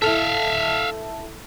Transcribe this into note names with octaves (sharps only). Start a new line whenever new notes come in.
E4 A4 E5 F5